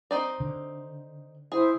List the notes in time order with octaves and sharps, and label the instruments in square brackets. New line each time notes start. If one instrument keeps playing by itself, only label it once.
[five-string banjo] C4 D#4 D5
[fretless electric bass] D3
[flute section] E4 C5 [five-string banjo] G#4